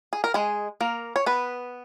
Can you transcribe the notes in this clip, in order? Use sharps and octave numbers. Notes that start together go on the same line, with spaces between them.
G#4
A#4
G#3 G#4
A#3 A#4
C#5
B3 B4